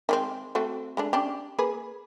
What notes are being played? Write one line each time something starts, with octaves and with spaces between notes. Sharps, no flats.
D#3 G#3 C4
A3 C4 F#4
G#3 A3 D4
C#4 D4 G4
A#3 G#4 B4